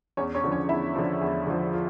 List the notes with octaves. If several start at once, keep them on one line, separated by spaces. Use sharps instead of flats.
E2 C#4 C#5
C#4 C#5
D3 F3
C#4 C#5
E2 E4 E5
D3 F3
E2
D3 F3
F4